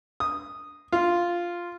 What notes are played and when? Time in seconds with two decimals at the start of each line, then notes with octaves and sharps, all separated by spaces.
0.20 D#6
0.92 F4